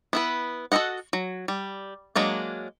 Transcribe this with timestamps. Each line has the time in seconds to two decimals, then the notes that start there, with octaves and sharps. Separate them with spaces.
0.13 B3 E4 B4
0.72 F#4 A4 A#4 D#5 F#5
1.13 F#3
1.48 G3
2.15 F#3 G#3 A#3 D4